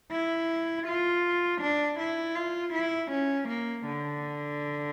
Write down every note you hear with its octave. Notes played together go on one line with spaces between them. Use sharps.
E4
F4
D4
E4
F4
E4
C#4
A#3
D3